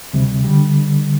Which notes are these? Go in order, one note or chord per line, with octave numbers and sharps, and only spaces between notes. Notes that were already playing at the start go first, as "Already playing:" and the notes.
D2 C3 G3
D3 G3